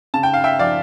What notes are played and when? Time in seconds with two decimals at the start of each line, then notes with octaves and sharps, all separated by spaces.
0.14 C#3 A5
0.23 G5
0.34 F5
0.44 E5 G5
0.59 F3 D5 F5